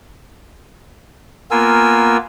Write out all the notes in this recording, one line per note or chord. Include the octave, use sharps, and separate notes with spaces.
A#3 B3 F4 A#4 G#5 E6